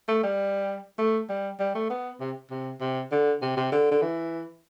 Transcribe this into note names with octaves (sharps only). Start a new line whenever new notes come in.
A3
G3
A3
G3
G3
A3
B3
C3
C3
C3
D3
C3
C3
D3
D3
E3